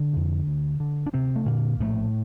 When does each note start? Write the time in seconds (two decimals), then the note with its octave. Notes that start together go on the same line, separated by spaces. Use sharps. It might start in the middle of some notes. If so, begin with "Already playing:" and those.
Already playing: D3 D4
0.13 F2 C3
0.47 D2
0.80 D3
1.07 D4
1.13 D2 C3 C4
1.36 A3
1.46 A#2 D3 A#3
1.80 A#1 A2 A3